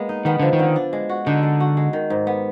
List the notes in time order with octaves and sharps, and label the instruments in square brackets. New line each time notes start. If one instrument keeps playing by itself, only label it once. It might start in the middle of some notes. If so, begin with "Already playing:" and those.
Already playing: [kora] G#3 A#3 B3
D#4
[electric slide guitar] D#3 [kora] B3
[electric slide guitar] D3 [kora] F3
[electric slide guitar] D#3
[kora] D3
D4
G#3
F#4
[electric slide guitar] D3 [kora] D#4
[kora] G#3
F#4
G#3
D#3
G#2
B3